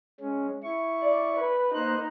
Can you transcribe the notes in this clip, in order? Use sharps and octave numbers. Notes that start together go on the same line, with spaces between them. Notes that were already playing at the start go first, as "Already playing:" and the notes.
G#3 C#4
E4 C#6
D5
B4
A#3 D#4 C5 F#6